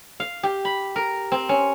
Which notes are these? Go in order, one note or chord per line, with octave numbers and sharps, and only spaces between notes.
F5
G4
B5
A#4
C4
C#4